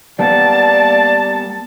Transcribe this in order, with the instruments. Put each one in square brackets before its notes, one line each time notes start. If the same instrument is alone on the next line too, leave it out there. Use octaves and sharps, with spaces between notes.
[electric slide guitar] G3 A#3 B3 [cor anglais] D5 [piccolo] A5